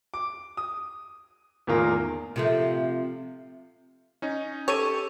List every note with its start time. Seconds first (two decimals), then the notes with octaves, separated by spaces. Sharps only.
0.14 D6
0.57 D#6
1.67 E2 A2 D#3 A#3 F4 A#4
2.36 C3 F3 A3
4.22 C#4 D#4
4.68 G4 A4 C#5 D#7